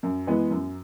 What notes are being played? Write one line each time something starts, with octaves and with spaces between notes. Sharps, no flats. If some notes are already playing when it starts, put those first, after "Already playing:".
F#2
E3 G#3 B3
F#2